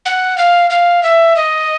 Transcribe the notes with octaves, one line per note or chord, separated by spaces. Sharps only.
F#5
F5
F5
E5
D#5